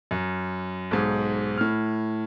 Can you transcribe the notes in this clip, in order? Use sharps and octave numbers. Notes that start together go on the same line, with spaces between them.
F#2
B1 G#2
A2 F6